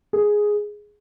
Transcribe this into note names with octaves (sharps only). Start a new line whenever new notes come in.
G#4